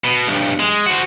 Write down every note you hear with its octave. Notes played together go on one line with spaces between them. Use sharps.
B2
B1 G2
G#3
F#4 C5